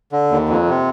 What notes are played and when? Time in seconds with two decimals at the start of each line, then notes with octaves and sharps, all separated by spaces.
0.12 D3
0.31 D#2
0.49 F2
0.68 C3